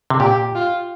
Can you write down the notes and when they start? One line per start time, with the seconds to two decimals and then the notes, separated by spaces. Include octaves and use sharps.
0.10 C3
0.20 A#2 G4
0.55 F4